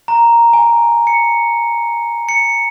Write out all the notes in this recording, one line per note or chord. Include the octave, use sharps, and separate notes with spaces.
A#5
G#5
C#7
C#7